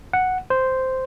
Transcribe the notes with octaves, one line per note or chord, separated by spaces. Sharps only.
F#5
C5